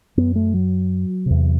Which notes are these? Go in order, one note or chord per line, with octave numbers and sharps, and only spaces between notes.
F#2 B3
A3
F#3
E2 C3